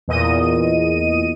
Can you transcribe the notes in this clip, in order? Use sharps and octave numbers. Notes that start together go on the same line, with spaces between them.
E2 A#2 D#5 D#7